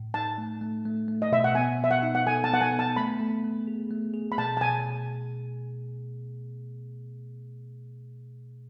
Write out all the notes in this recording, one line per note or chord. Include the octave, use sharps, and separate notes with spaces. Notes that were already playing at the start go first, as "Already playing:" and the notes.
Already playing: A2
D#4 A5
A3
A3
A3
A3
D#5
B2 E5
F#5
B3 G#5
B3 E5
F#5
D#4
F#5
A4 G#5
A5
B3 F#5
G#5
B3
A5
A3 B5
A3
A3
G#4
A3
G#4
B5
B2 A5
A5
B2 G#5